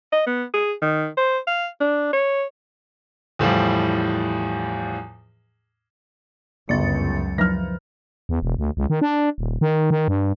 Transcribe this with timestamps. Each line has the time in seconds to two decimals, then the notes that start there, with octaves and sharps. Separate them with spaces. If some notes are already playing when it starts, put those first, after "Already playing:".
0.12 D#5
0.26 B3
0.53 G#4
0.82 D#3
1.17 C5
1.47 F5
1.80 D4
2.13 C#5
3.39 E2 A2 F3 G3
6.69 G1 C#2 F#2 A6 C#7
7.38 F3 F#3 F6 A#6
8.29 E2
8.42 E1
8.58 D2
8.77 C#2
8.90 D#3
9.01 D4
9.38 D#1
9.61 D#3
9.91 D#3
10.08 G2